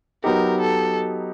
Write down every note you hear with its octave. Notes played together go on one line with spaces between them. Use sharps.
F#3 B3 D#4 G4 A#4
A4